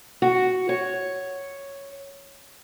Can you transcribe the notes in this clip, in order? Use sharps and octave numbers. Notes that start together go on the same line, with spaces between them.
F#4
C#5